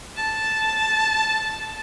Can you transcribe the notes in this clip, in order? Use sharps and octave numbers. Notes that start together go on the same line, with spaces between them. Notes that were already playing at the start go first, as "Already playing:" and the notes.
A5